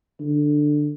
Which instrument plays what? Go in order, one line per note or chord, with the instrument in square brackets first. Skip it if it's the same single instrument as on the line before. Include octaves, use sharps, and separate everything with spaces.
[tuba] D3